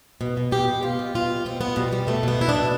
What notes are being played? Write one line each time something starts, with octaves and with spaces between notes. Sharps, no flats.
B2
B2
B2 G4
B2
B2 F4
B2
B2 F4
B2
B2 C4
B2 B3
B2 G3
B2 G3
B2 A3
B2 B3
B2 E4
D4
B2